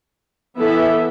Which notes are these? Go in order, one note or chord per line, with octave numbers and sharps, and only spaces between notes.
E3 B3 E4 A4 E5